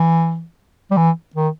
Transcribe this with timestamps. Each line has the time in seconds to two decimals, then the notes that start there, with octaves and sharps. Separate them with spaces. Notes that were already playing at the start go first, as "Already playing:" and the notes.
Already playing: E3
0.91 G3
0.97 E3
1.35 D#3